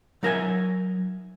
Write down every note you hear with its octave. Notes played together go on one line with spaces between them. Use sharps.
F#3 D#4 A#4 E5 F#5 G#5